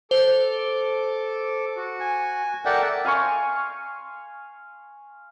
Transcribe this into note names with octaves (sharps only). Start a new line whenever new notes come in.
A4 C5 D6
F#4
G#5
A4 A#4 D5 E5 F#5 G5
F5 G#5 C6 C#6